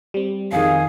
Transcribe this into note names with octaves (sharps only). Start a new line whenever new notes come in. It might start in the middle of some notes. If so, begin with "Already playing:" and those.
G3 C4
F2 D#3 G#4 F5